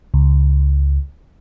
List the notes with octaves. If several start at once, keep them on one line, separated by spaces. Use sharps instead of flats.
C#2